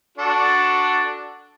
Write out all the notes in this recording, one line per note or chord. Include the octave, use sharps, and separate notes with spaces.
D4 F#4 A4